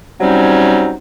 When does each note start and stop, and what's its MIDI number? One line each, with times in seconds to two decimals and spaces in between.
0.21 0.93 48
0.21 0.93 54
0.21 0.93 55
0.21 0.93 60
0.21 0.93 61
0.21 0.93 63